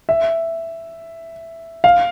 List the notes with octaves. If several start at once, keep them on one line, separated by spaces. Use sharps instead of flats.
E5
F5